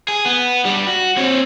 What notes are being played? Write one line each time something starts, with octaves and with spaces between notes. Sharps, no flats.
G#4
B3
G2 G3
F#4
C4 C#5